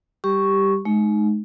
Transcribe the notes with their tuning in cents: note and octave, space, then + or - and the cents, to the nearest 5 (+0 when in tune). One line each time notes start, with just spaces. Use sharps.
G3 +0 G4 +0 C#6 +0
G#3 +35 D#4 -10